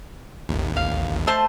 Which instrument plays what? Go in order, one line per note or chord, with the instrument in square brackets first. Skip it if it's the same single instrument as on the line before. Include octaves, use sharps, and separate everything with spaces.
[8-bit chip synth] A1 D#2
[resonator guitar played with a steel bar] F5
A3 C5 A5